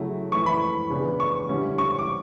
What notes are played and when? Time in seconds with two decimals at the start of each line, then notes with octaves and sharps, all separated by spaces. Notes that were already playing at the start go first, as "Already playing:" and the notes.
Already playing: C#3 F#3 A3 E4
0.32 E3 A3 E4 C#6
0.46 B5
0.90 C#3 E3 B3 D4
1.20 C#6
1.49 D3 G3 C#4 E4
1.78 C#6
1.98 D6